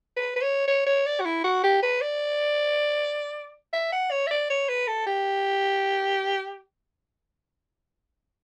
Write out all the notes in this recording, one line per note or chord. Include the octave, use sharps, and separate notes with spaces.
B4
B4
C#5
C#5
C#5
D5
F#4
E4
F#4
G4
B4
D5
E5
F#5
C#5
E5
D5
C#5
B4
A4
G4